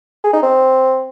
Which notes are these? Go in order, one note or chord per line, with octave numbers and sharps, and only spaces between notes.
G#4
D#4
C4